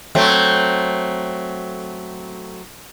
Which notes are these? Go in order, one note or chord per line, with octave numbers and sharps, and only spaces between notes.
F#3 A3 C4